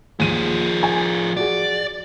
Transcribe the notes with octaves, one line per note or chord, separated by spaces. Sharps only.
D#2 F3 G#4 D#7
G#5
F#4 G#4 D5